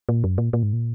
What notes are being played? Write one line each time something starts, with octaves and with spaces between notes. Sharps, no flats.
A#2
F#2
A#2
A#2
G#2
A#2